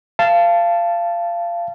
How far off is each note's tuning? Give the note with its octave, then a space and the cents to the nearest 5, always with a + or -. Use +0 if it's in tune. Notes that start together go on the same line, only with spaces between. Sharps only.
F5 -25 A5 +0